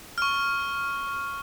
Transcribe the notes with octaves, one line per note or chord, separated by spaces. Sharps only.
C#6 F6